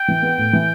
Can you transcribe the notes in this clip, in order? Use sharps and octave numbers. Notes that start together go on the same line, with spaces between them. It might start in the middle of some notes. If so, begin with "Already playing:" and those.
Already playing: G5
E3
B3
A2
E3